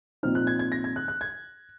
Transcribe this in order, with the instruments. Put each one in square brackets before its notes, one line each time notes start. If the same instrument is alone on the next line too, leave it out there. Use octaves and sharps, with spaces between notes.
[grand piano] A#2 F3 C4 D#4 F6
F#6
G#6
G#6
A#6
G#6
F#6
F#6
G#6